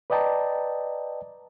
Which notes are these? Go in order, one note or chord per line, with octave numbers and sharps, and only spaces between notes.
B4 D5 D#5 G5 A5 A#5